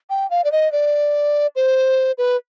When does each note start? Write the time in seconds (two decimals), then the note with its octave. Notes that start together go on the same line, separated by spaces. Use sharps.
0.10 G5
0.30 F5
0.44 D5
0.52 D#5
0.72 D5
1.56 C5
2.18 B4